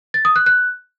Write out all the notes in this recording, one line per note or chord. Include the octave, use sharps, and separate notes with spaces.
A6
D#6
F#6
F#6